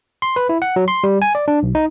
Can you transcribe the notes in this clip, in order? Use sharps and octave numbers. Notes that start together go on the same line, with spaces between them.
C6
B4
E4
F#5
F#3
C6
G3
G#5
D5
D4
B1
D#4